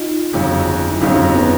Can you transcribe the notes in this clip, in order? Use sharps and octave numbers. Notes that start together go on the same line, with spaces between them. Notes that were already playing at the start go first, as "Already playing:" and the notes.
Already playing: D#4 F4
G1 F2 C#3 F#3
E4
G1 F2 C#3 F#3 C#4 D#4
B3 C#4